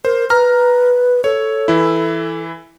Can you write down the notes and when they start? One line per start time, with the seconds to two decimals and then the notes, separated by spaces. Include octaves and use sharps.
0.05 A#4 C5
0.30 B4 A#5 F6
1.24 A4 C#5
1.68 E3 E4